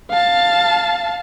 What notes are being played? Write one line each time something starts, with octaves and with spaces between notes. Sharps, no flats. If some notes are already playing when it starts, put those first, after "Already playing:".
F5 A5